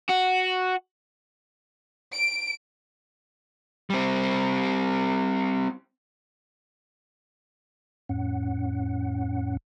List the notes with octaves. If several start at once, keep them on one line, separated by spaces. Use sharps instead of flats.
F#4
D7
G3 C4
F2 A2 C#4 F#5